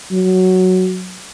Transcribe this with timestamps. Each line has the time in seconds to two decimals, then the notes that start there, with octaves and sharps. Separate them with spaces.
0.11 F#3